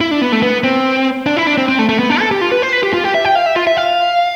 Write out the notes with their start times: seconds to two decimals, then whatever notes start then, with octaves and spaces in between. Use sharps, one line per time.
0.01 E4
0.11 D4
0.22 B3
0.32 A3
0.43 B3
0.64 C4
1.26 D4
1.37 E4
1.47 D4
1.58 C4
1.68 C4
1.79 A3
1.89 A3
1.99 B3
2.10 D4
2.20 A4
2.31 G4
2.41 F4
2.52 B4
2.62 C5
2.73 B4
2.83 G4
2.94 F4
3.04 G4
3.14 E5
3.25 G5
3.35 F5
3.46 E5
3.56 F4
3.67 E5
3.77 F5